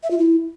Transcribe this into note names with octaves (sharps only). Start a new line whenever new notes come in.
E5
F4
E4